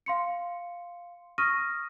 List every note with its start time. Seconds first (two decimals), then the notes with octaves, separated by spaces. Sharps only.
0.06 F5 C6 C#7
1.38 C#6 D#6 F6 A#6 D#7